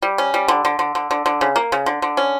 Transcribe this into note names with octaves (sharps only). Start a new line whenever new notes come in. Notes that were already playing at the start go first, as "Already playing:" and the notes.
G3
C#4
G3
D3
D3
D3
D3
D3
D3
C#3
A#3
C#3
D3
D3
C#4